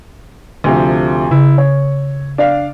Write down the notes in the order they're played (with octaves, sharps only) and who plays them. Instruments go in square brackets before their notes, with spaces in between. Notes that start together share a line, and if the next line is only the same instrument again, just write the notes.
[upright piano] D2 C3 F3
[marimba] C#3 [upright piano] E4
[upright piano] C#5
D4 D5 F5